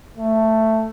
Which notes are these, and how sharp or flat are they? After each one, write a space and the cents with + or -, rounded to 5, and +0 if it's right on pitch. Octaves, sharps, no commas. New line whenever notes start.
A3 +10